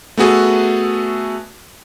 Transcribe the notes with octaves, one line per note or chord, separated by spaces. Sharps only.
A3 B3 F#4 G#4 A4